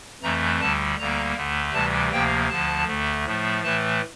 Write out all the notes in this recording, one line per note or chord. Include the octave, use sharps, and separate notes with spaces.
F2 E3 A3 A#5
D2 D3 G3 A5
D2 D3 G3 A#3 A#5
D2 D3 A3
D2 C3 E3 G3 A5
D2 C3 F3 A#3 G5
D2 D3 F3 A5
D2 D3 A3
A2 F3 A3
A2 E3 A3 A5